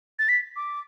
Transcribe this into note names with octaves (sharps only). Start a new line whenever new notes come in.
A6
B6
D6